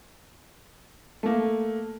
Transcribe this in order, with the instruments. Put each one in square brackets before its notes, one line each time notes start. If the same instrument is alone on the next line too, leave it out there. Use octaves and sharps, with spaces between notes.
[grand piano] A3 A#3